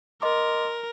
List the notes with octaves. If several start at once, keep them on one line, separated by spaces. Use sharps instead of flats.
A#4 D#5 C6 D6